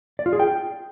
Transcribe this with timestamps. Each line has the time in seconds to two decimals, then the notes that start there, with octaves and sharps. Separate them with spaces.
0.19 D5
0.26 F4
0.33 G#4
0.40 G5